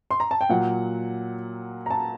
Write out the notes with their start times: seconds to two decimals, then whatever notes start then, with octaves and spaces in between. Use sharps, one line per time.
0.11 C6
0.20 A#5
0.31 A5
0.41 G5
0.49 A#2 F#3 F#5
1.86 A#5
1.90 A5